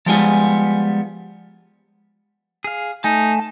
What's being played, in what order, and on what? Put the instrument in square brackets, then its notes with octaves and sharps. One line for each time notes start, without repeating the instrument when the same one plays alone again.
[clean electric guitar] F3 G3 G#3 B3 F4 G#4
[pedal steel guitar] G#4 F5
[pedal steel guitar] A3 [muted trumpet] D#4 [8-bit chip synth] G#5 [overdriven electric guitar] A5